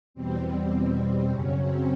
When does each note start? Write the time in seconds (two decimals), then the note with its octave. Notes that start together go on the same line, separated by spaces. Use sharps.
0.14 E2 B2 G3 C4
1.30 F#2 C#3 F#3 C#4
1.59 C4